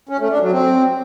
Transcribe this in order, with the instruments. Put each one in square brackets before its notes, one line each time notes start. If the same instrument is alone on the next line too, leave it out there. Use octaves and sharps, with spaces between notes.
[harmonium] C#4
A3
D4
F#3
C4